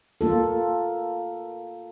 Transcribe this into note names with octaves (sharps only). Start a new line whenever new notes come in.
A#3 F4 A4